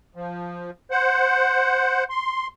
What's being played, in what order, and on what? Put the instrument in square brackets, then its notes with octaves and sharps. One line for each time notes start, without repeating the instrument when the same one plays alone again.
[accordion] F3
C5 F#5
C6